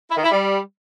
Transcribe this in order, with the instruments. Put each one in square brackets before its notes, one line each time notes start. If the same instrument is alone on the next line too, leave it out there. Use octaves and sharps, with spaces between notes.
[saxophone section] E4
D#3
E4
G3